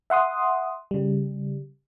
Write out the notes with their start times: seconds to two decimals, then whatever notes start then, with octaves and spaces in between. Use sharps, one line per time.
0.10 E5 F#5 C6 D#6
0.91 C#3 G3